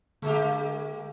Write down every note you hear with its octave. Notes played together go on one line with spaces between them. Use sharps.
D3 G#3 A#3 G4